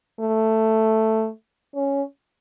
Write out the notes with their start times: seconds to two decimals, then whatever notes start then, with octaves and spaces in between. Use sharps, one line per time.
0.20 A3
1.75 C#4